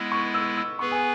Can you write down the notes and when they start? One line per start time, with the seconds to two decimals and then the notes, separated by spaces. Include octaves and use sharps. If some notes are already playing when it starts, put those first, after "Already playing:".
Already playing: G#3 B3 E4 E6
0.12 C#6
0.34 E6
0.57 E6
0.79 B3 G#4 B4 C#6
0.91 G#5